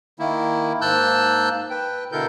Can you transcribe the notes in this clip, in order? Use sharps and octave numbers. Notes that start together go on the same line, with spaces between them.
D#3 A#3 E4
G#2 A#3 A5 E6 F#6 G6
B4 G5
B2 D3 E4 A4 A#4 G6